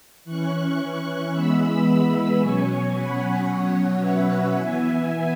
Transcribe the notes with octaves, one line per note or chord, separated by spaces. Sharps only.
E3 C#4 C#6 F#6
E3 G#3 B3 B5 E6
B2 F#3 C#4 G#5 C#6
F#5 B5
B2 F#3 C#4 C#5 F#5
B4 E5
E3 B3 E5 G#5